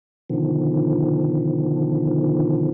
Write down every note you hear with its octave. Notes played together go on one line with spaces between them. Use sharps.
B2 D3 D#3 F3